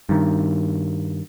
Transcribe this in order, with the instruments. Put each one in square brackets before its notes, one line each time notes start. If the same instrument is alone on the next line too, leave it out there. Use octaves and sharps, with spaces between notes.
[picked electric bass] G2 D#3